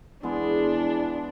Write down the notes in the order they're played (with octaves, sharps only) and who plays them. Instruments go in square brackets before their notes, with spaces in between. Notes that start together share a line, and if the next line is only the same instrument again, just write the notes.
[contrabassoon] E2 [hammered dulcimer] G#3 B3 E4 [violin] D4